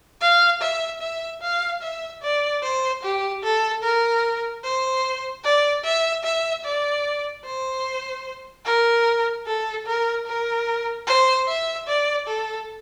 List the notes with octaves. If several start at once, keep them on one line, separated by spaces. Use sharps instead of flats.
F5
E5
E5
F5
E5
D5
C5
G4
A4
A#4
C5
D5
E5
E5
D5
C5
A#4
A4
A#4
A#4
C5
E5
D5
A4